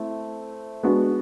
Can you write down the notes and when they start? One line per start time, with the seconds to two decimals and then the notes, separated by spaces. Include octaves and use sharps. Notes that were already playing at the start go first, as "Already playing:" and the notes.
Already playing: A3 C4 E4
0.83 G#3 B3 D4 F#4